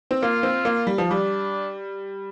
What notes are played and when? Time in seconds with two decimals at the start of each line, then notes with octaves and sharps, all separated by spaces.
0.11 C4
0.22 A#3 F4
0.43 C4
0.65 A#3
0.87 G3
0.98 F3
1.09 G3 D4